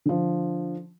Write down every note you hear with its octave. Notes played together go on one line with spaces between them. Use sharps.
D3 F3